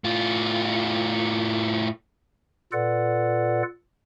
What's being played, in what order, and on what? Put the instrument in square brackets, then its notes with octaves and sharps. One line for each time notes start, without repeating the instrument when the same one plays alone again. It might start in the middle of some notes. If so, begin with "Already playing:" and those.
[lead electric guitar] A2 F4
[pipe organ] A#2 F4 A4 B4 D5 F#5